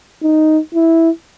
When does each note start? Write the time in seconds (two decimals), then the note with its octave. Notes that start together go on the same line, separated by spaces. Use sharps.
0.23 D#4
0.74 E4